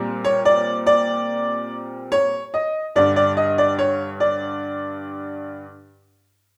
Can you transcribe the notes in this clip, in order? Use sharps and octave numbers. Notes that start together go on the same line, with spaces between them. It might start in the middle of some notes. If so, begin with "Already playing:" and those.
Already playing: A#2 G3 C4
C#5
D5
D5
C#5
D#5
G2 D3 G3 D5
D5
D#5
D5
C#5
D5